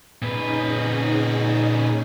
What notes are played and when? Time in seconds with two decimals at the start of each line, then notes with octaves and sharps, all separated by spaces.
0.22 A#2 C#4 D#4 G#4 B4